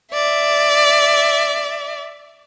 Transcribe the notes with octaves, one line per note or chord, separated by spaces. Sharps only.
D5 E5